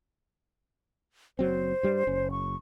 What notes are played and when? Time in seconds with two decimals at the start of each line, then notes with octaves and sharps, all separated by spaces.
1.39 F#1 F#3 C4 C5
1.83 G2 G3
2.07 F#1 C#4
2.31 C#6